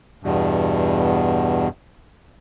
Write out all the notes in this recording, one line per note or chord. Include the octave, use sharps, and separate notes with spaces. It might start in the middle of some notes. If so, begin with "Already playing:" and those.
E2 G2 B2